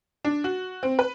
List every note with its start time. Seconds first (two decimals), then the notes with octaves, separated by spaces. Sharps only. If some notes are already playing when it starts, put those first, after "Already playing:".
0.25 D4
0.44 F#4
0.83 C4
0.99 B4